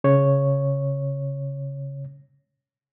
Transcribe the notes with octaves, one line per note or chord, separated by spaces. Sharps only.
C#3 C#5